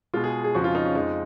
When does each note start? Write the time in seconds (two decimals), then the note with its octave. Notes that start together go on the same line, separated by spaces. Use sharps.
0.14 G#3 F4
0.16 B2
0.24 G#4
0.44 G#4
0.54 F2 C#3 F3 G#3 F#4
0.64 F4
0.75 D#4
0.85 C#4
0.95 F2 F3 G#3 D#4